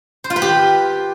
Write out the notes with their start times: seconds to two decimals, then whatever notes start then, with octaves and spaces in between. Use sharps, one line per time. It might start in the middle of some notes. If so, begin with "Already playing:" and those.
0.24 C5
0.30 F4
0.36 B4
0.42 G4